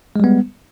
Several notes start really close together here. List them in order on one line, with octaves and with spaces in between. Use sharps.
G#3 G3 B3